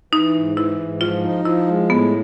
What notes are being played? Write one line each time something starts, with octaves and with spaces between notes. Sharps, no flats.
E3 D#4
G#2
E3 E4
G#2
F3 F4
D#4
F3 E4
G#3
A2 B3